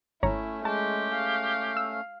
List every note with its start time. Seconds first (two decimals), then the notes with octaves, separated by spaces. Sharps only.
0.23 G#1 A3 C#4 E4 C#5 A#5
0.65 G#3 G4 A5
1.14 F5
1.77 E6